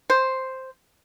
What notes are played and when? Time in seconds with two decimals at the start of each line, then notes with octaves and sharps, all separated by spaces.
0.10 C5